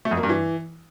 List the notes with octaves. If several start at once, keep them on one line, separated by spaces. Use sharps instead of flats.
A3
F2
A#3
G2
E3